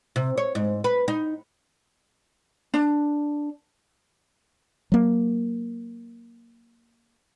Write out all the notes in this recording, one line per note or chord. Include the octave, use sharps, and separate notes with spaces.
C3
C#5
G#2
B4
D#4
D4
F#3 A#3